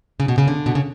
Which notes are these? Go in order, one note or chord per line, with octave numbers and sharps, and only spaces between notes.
C#3
B2
C#3
D3
B2
C#3